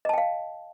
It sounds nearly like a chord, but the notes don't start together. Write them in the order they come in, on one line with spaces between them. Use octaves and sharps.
D#5 A5 G5 F5